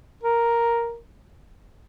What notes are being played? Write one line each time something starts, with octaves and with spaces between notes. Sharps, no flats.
A#4